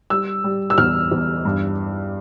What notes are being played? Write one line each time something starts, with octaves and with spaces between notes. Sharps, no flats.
G3 E6
G3
E6
E2 F6
E2
G2